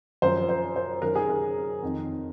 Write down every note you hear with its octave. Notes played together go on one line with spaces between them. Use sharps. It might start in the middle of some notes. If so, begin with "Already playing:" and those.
F#2 F3 C5
C5
C5
F#2 D#3 A#4
G#4
A#4
F2 D#3